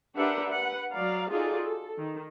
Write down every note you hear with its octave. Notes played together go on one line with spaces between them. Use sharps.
D4 G4 A#4 B4 E5 F#5
B4 F#5
F#3 D5 F5 A#5
D#4 F4 F#4 G#4 A4 D5
A4
D#3